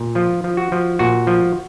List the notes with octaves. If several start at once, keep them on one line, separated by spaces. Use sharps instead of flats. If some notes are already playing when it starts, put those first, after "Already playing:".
Already playing: A#2
F3 F4
F3
F#4
F3
A#2 F#4
F3